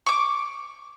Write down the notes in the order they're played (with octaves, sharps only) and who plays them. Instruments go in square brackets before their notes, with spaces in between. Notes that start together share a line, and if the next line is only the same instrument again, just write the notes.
[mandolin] C#6 D6